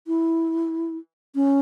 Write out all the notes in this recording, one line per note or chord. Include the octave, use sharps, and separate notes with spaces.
E4
C#4